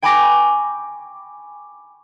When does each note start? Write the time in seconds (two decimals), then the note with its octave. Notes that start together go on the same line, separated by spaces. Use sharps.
0.02 G5 G#5 B5 C#6 D6 A#6